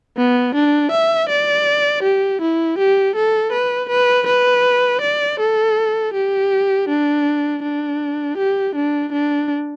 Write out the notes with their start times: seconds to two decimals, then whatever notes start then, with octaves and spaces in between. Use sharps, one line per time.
0.17 B3
0.55 D4
0.92 E5
1.29 D5
2.03 G4
2.42 E4
2.79 G4
3.16 A4
3.52 B4
3.90 B4
4.27 B4
5.02 D5
5.40 A4
6.14 G4
6.89 D4
7.63 D4
8.38 G4
8.75 D4
9.13 D4